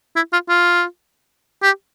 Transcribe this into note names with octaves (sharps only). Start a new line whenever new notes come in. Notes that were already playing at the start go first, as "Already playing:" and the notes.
E4
F4
F4
G4